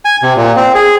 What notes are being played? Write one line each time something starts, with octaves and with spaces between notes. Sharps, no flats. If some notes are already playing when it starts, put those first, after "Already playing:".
G#5
C3
A#2
C4
G#4